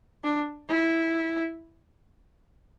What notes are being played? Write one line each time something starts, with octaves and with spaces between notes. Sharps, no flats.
D4
E4